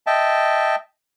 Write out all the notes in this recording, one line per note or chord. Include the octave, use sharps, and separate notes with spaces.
D#5 E5 G5 A5